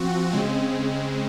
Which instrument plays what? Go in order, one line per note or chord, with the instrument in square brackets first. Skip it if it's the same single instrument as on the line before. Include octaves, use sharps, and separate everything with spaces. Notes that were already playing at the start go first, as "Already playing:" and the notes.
Already playing: [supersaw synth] F3 C4 F#4
C#3 G#3 C4